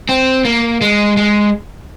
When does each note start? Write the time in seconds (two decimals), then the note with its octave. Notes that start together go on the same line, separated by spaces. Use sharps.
0.09 C4
0.45 A#3
0.81 G#3
1.17 G#3